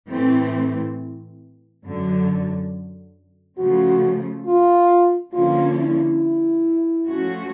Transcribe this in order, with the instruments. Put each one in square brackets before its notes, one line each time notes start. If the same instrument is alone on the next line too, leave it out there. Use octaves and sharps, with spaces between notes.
[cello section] A2 E3 A3 C4
F#2 D3 F#3
[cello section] C#3 F3 A3 [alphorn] F#4
[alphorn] F4
[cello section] D3 F3 A#3 C#4 [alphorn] F4
[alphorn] E4
[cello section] F3 A3 C#4 F#4